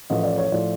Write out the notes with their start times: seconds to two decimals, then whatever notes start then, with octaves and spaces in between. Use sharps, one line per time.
0.10 A1 A2 F3 D#5
0.24 D5
0.38 C#5
0.52 A2 F3 D5